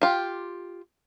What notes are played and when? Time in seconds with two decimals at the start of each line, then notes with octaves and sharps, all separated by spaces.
0.02 F4 G4